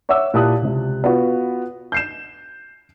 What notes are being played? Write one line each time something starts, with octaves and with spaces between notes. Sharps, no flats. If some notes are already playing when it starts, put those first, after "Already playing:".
C#5 E5 F#5 D6 E6
A#2 E4 G4 A5 D#6 F#6
C#2 C3
B3 F4 F#4
G6 C7 E7